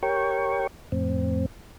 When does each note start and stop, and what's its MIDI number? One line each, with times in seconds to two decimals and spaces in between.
0.03 0.67 67
0.03 0.67 70
0.03 0.67 73
0.03 0.67 79
0.03 0.67 85
0.92 1.46 41
0.92 1.46 45
0.92 1.46 60